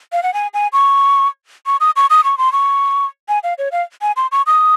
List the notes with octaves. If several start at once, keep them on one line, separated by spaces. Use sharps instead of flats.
F5
F#5
G#5
G#5
C#6
C#6
D#6
C#6
D#6
C#6
C6
C#6
G#5
F5
C#5
F5
G#5
C6
C#6
D#6